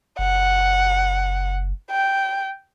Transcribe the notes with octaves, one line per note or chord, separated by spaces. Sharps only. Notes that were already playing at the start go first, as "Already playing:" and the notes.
F#1 F#5
G5